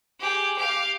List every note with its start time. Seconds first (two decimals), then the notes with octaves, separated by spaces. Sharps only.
0.20 G4 G#4
0.57 G4 F5